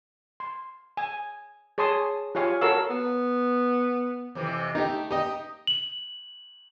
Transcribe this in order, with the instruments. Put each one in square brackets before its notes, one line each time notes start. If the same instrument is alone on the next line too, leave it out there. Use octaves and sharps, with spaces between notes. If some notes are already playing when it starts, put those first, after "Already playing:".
[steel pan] C6
G#5
G#4 C#5 A5 C6 D#6
F4 G4 C#5 F5 G#5 C#6
F#4 A4 A#4 C#5 F5 E6
[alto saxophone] B3
[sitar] F2 C3 E3
[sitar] A3 [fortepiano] D#4 G4
[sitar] D#4 [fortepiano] G4 D#5
[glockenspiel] F#7